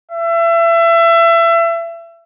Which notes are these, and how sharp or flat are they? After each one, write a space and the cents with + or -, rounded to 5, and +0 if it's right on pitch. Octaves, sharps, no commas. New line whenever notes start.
E5 +30